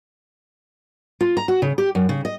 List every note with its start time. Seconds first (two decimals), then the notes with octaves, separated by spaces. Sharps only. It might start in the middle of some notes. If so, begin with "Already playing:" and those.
1.21 F4
1.37 A#5
1.48 F#4
1.62 C#3
1.78 G4
1.95 F#2
2.09 C#3
2.25 D#5